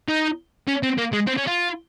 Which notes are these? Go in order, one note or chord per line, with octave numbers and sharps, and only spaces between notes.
D#4
C#4
C4
A#3
G#3
C4
C#4
F4